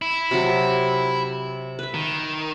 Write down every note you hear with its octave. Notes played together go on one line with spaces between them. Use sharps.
E4
C3 F#3
B4 E5
D#3